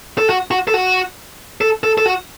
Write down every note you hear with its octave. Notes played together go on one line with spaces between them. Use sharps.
A4
F#4
F#4
A4
F#4
A4
A4
A4
F#4